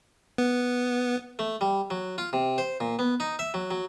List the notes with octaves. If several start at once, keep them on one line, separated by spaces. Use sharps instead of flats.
B3
A3
G3
F#3
F4
C3
C5
A#2
B3
D#4
E5
F#3
F#3